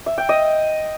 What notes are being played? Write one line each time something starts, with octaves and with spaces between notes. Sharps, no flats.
E5
G5
D#5